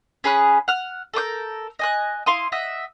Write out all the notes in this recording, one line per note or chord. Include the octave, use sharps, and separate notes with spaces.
C#4 G#4 B5 F#6
F#5 F6
A4 A#4 D6 G6
D#5 G#5 F#6
E4 F5 C6 D#6
D#5 E5 F#5